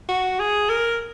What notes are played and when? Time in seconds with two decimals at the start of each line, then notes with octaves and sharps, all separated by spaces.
0.09 F#4
0.39 G#4
0.70 A#4